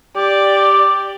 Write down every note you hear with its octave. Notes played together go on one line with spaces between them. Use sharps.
G4 D5